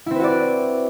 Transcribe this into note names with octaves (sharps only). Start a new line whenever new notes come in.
C4 E4 F#4 B4 D5